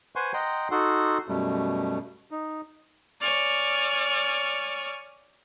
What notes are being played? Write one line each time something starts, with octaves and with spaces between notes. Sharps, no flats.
B4 C5 F#5 G#5 C6 C#6
D#5 F#5 G5 A#5 C6
D#4 F#4 A4 F#5 C6
F#2 B2 G3 A3
D#4
C#5 D5 G#5 F6